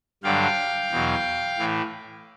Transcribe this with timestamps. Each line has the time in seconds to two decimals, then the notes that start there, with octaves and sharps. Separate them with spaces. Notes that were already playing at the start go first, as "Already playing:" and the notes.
0.23 G2 D3 F#3 F5 G5
0.91 E2 B2 F#3
1.58 A2 E3